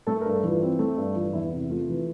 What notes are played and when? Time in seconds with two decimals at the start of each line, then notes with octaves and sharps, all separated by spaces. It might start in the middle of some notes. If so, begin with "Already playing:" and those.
0.07 A3 A4
0.21 A#4
0.25 G2
0.34 A4
0.43 E3 F4
0.62 C4
0.79 A3
0.97 G2
1.15 E3 F4
1.33 E2 E4
1.51 C3 E4
1.70 A3 F4
1.89 E3